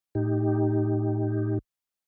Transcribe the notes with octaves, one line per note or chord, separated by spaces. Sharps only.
A2 D#4 G4